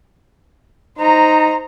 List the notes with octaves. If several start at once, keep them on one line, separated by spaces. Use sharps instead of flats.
D#4 C5 A#5